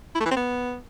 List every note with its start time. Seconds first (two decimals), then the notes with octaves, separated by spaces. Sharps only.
0.15 E4
0.20 A3
0.26 E3
0.31 C4
0.36 B3